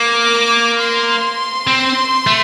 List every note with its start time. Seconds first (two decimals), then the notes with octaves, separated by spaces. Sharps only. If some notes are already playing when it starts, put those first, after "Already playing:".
Already playing: A#3 D6
0.80 C6
1.67 C4
2.27 A3